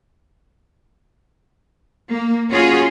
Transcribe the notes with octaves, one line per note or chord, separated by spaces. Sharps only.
A#3
C#4 F4 F#4 G#4